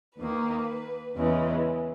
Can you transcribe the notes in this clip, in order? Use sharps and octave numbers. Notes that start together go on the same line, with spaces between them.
D#2 D#3 A#3 B4
E2 C#3 E3 G#3